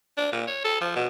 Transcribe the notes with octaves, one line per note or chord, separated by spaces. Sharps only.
D4
A#2
C#5
A4
F3
B2